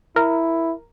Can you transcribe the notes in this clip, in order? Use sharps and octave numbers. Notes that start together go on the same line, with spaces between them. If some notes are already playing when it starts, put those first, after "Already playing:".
E4 A#4